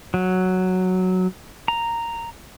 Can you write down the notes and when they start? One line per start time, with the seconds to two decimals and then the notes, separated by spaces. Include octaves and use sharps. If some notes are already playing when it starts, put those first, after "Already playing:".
0.14 F#3
1.68 A#5